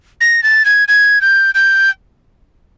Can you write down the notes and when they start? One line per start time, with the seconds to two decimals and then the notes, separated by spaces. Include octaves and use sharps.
0.21 A#6
0.43 A6
0.65 G#6
0.88 G#6
1.21 G6
1.55 G6